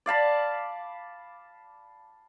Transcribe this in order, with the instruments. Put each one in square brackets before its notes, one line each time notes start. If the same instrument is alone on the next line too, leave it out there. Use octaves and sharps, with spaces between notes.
[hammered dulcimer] D5 F5 A5 B5